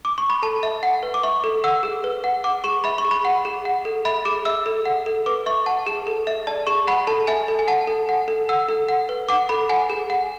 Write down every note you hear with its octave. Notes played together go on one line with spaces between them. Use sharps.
D6
C#6
B5
A4 A5
E5
F#5
B4
D6
E5 C#6
A4
F#5 E6
G#4
B4
F#5
F#5 D6
G#4 C#6
E5 B5
C#6
G#4
B5
F#5
G#4
F#5
A4
E5 B5
G#4 D6
E5 E6
A4
F#5
A4
B4 D6
E5 C#6
F#5 A5
G#4
A4
E5
D5 A5
G#4 C#6
F#5 B5
A4 A5
E5 G#5
A4
G#5
F#5 A5
A4
F#5
A4
F#5 E6
A4
F#5
B4
F#5 D6
A4 B5
F#5 G#5
G#4
F#5